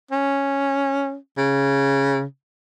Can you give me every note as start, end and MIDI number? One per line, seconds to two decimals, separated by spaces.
0.11 1.16 61
1.38 2.23 49